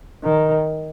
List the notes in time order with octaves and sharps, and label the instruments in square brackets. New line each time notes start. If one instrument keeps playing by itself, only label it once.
[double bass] D#3